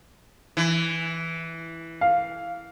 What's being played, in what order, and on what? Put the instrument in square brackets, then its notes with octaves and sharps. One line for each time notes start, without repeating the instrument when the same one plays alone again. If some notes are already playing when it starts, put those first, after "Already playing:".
[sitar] E3
[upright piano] F5